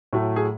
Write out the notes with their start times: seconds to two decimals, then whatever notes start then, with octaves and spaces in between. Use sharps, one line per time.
0.13 A2 F#3 A3
0.36 G#4